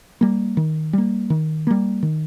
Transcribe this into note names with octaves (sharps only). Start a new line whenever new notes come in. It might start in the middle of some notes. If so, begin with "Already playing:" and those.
G3 A#3
D#3
G3 A#3
D#3
G3 A#3
D#3